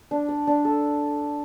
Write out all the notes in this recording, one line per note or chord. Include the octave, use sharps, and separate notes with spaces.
D4
D5
D4
A4